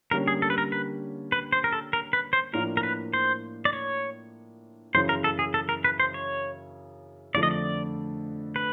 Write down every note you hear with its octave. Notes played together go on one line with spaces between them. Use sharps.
D3 G3 A#3 C#4 A#4
G#4
A4
B4
A#4
B4
B4
C5
A#4
A4
A#4
B4
C5
A2 F3 A#3 D4 F4 A#4
A#4
B4
C5
D5
C#5
F#2 C#3 E3 C5
A#4
A4
G#4
A4
A#4
B4
C5
C#5
F2 D3 F3 A3 D4 D5
D#5
D5
B4